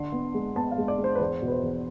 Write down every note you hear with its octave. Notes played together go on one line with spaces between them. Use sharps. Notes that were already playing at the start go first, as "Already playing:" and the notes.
Already playing: D3 C6
B3
G#3
B3 A5
F5
G#3
D5
G#3
C5
B4
E2 C5
B2
B4
C5
E2